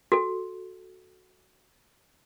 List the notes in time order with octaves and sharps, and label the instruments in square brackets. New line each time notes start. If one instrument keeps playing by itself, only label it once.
[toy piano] F#4 A4